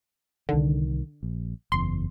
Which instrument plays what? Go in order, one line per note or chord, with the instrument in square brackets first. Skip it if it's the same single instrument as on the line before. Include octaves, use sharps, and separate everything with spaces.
[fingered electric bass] C2 D#3 [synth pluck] D3
[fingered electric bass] A#1
[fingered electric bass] F#1 E2 [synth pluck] C6